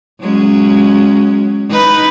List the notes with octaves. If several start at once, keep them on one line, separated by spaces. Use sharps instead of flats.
F#3 G#3 C#4
D#4 B4